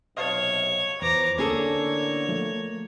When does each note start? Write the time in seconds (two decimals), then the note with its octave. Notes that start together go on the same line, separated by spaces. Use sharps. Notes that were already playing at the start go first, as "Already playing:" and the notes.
0.17 B1 C3 C#5 D#5 F5 A5
1.02 E2 F4 B4 C5 A#5 D6
1.38 E2 A2 D3 A#3 C#4 G#4 A4 C#5
2.29 F3 A3